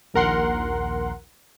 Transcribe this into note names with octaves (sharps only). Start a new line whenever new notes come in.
A#1 D#2 A#4 F#5 C6